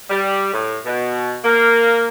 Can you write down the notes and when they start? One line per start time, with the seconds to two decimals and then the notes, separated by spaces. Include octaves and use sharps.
0.10 G3
0.53 A2
0.85 B2
1.44 A#3